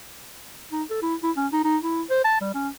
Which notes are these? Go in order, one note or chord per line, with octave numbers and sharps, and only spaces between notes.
D#4
A4
E4
E4
C#4
D#4
D#4
E4
C5
A5
G3
C#4